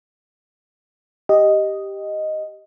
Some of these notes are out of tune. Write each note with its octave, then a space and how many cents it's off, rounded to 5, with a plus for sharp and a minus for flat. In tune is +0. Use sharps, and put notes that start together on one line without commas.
G4 +0 D#5 +0